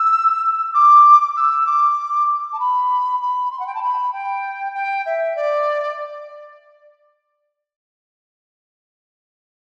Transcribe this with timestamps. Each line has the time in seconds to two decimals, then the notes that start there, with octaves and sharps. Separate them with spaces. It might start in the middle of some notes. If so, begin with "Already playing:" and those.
Already playing: E6
0.74 D6
1.37 E6
1.67 D6
2.53 A5
2.60 B5
3.21 B5
3.51 C6
3.60 F#5
3.67 G5
3.75 A5
3.82 B5
4.13 G5
4.74 G5
5.06 E5
5.36 D5